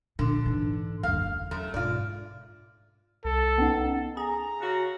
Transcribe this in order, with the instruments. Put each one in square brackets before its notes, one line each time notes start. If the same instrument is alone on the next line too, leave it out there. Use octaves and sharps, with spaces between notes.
[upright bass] A#2 F3 [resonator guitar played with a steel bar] D3
[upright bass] G#2 E3
[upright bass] F#1 D2 [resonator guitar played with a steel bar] F5
[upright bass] E2
[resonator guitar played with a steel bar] F#2 A3
[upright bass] G#2 B2 [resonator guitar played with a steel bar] F4 D5
[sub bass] C2 [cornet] A4
[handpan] B3 D#4 [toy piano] C#4 F#5
[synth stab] G#4 [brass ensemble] A#5
[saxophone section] C#3 F#4